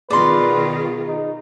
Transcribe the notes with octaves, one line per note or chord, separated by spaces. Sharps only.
B2 D#3 F4 G#4 B4 D5 C6
D#4